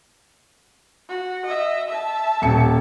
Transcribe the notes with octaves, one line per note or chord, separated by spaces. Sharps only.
F#4
D#5 E5
E5 A5
D#1 C#7